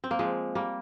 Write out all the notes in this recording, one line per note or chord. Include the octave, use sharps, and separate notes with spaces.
C4
A#3
F3 G#3
G3 A#3